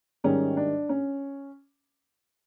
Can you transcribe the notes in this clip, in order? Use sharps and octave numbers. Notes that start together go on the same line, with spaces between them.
G#2 D#3 G3 C#4
D4
C#4